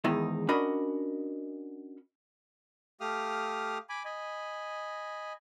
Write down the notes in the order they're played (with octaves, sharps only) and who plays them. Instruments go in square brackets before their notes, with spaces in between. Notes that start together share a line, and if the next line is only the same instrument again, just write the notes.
[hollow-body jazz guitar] E2 G#2 D#3 D#4 E4
C#4 D4 F#4 A#4 D#5 B5
[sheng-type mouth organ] A3 G4 F5 D#6 F6
G#5 B5 D6
D#5 G#5 B5